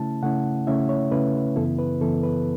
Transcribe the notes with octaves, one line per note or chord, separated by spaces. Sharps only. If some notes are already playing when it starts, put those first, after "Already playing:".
Already playing: C#3 A3 C#4 E4 A5
C#3 A3 C#4 E4 F#5
C#3 A3 C#4 E4 E5
C#5
C#3 A3 C#4 E4 B4
F#2 C#3 E3 B3 E4 A4
B4
F#2 C#3 E3 B3 E4 A4
B4